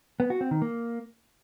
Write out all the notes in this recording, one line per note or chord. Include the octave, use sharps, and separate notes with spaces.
B3
F#4
C4
D#3
A#3